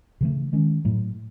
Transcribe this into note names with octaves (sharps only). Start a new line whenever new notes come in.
C#3 E3 A3
D#3 G#3 C#4
A2 F#3 A3